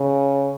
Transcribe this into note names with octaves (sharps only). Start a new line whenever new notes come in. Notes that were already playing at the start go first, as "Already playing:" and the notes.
Already playing: C#3